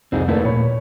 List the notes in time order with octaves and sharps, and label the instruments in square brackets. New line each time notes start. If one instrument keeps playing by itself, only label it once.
[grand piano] C2 F2 [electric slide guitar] C4 D#4 G#4
[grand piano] D#2 A4 D5 [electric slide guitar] A3 E4 B4
[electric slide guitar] A#2 [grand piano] C#5 B5